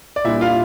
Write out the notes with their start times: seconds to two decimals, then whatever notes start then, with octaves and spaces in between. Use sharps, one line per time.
0.16 D5
0.24 A#2 G3 D4 E4 E5
0.41 F4 F5